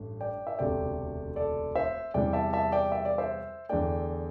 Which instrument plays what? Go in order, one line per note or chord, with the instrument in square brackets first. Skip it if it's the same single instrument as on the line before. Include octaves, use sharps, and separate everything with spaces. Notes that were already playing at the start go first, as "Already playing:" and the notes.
Already playing: [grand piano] A1 G2 A3
D5 G5
E5
E1 D2 C3 A3 D5 G5
A4 D5
C5 E5
E2 C3 E3 G3 D5 G5
E5 A5
E5 A5
D5 G5
E5
D5
C5 E5
E2 D3 A3 D5 G5